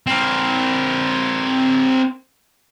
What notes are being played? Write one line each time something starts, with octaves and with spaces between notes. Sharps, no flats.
C4 A#4